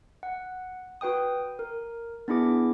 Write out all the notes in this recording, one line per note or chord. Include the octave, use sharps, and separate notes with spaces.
F#5
F#4 B4 G5 D#6
A#4
B3 D4 E4 G#4 D6